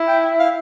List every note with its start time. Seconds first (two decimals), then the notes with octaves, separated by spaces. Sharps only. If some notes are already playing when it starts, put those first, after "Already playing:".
Already playing: E4
0.08 G5
0.40 F5